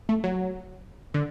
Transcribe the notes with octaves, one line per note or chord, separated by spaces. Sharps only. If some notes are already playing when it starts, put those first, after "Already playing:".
A3
F#3
D3